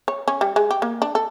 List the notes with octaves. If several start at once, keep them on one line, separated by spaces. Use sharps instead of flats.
C#5
C#4
G3
G#3
G4
A#3
D4
A4